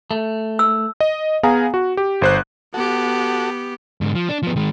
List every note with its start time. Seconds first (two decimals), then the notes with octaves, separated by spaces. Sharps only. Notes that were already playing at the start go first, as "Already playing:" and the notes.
0.11 A3
0.59 E6
1.00 D#5
1.43 B3 G#4 F5 G#5 A#5
1.74 F#4
1.97 G4
2.22 G1 C5 F#6
2.74 B3 F#4 G4 A4
4.01 G#2 D3
4.15 F3
4.29 D4
4.43 F3 B3
4.56 D#3 G#3